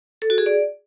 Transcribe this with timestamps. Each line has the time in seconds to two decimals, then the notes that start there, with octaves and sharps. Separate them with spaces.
0.22 A4
0.30 F#4
0.38 G#4
0.46 D5